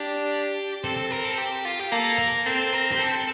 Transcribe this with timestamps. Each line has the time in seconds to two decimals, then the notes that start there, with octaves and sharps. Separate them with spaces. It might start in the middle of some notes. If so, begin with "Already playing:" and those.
Already playing: D4 G4
0.83 C4 A4
0.97 A4
1.11 A#4
1.25 A4
1.38 G4
1.65 F4
1.80 G4
1.92 A#3 A4
2.19 A#4
2.46 C4 A4
2.73 A#4
2.92 G4
2.99 A4